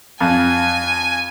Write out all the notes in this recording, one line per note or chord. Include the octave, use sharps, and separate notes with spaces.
F2 G#5